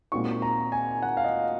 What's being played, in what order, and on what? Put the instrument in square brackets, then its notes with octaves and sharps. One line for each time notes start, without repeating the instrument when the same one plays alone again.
[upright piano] A#2 G#3 C4 D#4 F#4 [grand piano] C#6
[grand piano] A#5
G#5
F#5
F5
D#5